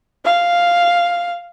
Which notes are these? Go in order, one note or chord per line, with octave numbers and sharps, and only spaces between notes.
F5